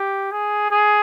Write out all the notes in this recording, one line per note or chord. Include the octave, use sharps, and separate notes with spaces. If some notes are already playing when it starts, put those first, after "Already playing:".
Already playing: G4
G#4
G#4